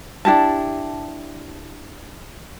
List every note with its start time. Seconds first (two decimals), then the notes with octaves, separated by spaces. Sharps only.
0.25 D4 E4 G4 A5